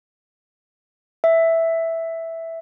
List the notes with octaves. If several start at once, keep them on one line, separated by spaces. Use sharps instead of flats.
E5